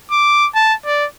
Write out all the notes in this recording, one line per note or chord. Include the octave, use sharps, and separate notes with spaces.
D6
A5
D5